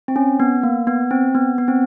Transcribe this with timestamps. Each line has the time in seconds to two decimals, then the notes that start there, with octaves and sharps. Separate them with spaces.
0.08 C4
0.16 C#4
0.40 B3
0.63 A#3
0.87 B3
1.11 C4
1.35 B3
1.58 B3
1.68 C4